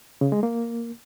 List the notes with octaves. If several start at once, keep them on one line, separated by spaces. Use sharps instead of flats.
C#3
G#3
A#3